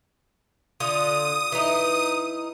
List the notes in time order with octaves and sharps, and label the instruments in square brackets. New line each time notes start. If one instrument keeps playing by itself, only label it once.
[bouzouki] D3 F4 [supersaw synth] D#6
[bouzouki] E3 D#4